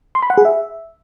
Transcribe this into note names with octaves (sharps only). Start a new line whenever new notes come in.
C6
B5
F#5
G#4
E5